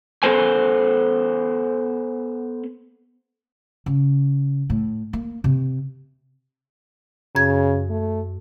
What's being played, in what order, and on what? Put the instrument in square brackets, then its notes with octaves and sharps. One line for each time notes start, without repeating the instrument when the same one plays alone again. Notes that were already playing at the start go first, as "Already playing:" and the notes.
[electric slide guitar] B3 A4 B4 C5 G#5
[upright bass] C#3
A2
A#3
C3
[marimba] F#2 G#6 [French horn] C#3
[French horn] A3